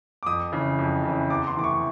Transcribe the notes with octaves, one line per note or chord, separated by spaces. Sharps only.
D6
F2 D#6
C#3 E3
F2
C#3 E3
E2 D6
C6
C3 E3 A3 D6
C#6